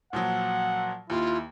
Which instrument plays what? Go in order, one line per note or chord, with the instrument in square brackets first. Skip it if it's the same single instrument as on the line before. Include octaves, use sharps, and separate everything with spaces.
[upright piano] A#2 F3 F#3 [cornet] F#5
[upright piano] D#2 [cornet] E4 [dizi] F4